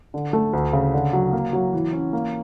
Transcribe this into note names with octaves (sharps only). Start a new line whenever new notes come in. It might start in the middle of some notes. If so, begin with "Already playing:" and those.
D3
A3
D2
C#3
D3
F#3
A#3
F#3
E3
C#4
A#3